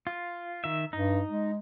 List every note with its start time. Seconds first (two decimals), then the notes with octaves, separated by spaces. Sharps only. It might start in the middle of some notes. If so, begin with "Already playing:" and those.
0.07 F4
0.64 D#3 E5
0.93 G2 D#4
1.29 G#3